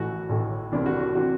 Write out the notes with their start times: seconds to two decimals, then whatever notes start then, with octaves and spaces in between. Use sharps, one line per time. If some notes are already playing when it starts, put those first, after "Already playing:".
Already playing: A1 A2 E3 F#4
0.29 A1 A2 E3
0.72 C2 C3 E3 D4
0.86 F#4
1.00 F#4
1.15 C3 E3 F#4